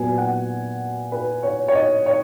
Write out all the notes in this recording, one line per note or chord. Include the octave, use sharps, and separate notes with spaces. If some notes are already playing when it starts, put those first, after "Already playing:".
Already playing: A#2 F#3 B3 G#5
F#5
B4
C#5
C#5
D#5
C#5